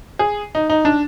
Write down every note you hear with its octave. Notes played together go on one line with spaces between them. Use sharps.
G#4
D#4
D#4
D4